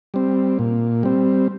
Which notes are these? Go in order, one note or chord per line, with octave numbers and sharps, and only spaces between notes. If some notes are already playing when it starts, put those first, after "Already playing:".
G3 C4
A#2
G3 C4